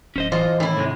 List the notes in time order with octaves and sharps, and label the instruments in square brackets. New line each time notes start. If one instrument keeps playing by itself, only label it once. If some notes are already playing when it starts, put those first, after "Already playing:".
[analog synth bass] D1 [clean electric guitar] C#4 C5 D#5
[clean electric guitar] E3 [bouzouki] F4 C5 D#5
[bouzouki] A2 E4 [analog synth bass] D#3
[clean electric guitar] G#2 C3 G#3